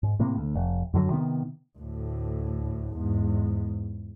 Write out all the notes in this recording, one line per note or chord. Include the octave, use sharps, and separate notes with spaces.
G#2
A2 C3 A#3
D2
F1
F#2 D3 D#3 F#3
C3 D#3 B3
D2 A2
E2 G#2